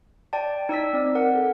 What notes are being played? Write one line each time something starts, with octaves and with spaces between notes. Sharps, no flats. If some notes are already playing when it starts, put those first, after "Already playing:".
D5 G5 A5
D#4 D5 E6 B6
C4 D5
A#4 F#5
A4